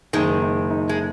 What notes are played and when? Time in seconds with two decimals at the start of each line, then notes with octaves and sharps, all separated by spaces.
0.13 F#1 D#3 G#3
0.42 D#4
0.70 D#4
0.89 G#3